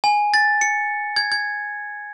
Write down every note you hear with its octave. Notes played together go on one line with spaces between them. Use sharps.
G#5
A6
C#7
G#6
G#6